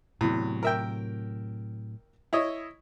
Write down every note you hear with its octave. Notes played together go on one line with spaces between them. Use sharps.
E2 A2 C3 F#3
A#4 E5 G5
E4 C#5 D#5